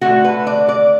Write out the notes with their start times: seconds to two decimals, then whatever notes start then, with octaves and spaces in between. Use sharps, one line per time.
0.01 D3 A3 F#4
0.24 B4
0.47 D5
0.69 D5